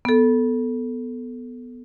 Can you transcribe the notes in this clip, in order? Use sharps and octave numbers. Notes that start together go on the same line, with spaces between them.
B3 A4